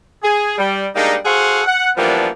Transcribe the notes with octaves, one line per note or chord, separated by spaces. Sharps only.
G#4
G3
G3 G#3 A#3 D4 D#4
F#4 G#4 A4 C5 F5 F#5
F#5
E3 F3 G3 A#3 B3 D4